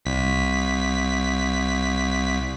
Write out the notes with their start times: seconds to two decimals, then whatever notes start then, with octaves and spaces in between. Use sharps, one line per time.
0.05 C2 B6